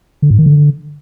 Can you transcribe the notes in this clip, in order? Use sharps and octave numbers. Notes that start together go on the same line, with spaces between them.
D3
G#2
D#3
D3